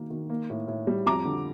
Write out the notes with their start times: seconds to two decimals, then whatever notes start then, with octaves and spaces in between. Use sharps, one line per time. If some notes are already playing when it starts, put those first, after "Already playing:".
Already playing: D#3 A#3
0.10 D#3
0.30 A#3
0.50 A2
0.68 A2
0.87 G3
1.06 F2 A#5 D6
1.25 D3